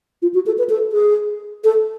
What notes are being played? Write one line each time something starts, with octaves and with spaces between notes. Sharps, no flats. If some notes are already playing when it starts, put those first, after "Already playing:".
F4
F#4
A4
B4
A4
G#4
A4